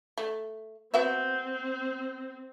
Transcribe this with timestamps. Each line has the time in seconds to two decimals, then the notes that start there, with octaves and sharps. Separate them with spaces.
0.18 A3
0.94 B3 C4 F#4 E5